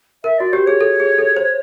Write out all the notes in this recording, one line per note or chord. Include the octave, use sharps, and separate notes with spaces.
A#4 E5
F#4 D5
G4 C5
G#4 C#5
A4
G#4
A4
C5